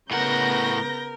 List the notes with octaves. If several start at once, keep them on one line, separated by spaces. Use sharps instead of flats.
A2 C#3 B3 A#4 F#5 G6 A#6